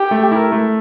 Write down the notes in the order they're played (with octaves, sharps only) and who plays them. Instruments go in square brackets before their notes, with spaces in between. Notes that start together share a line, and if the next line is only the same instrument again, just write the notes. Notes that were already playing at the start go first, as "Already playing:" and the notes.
Already playing: [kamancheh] G4
[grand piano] A3
E4 A#4
A3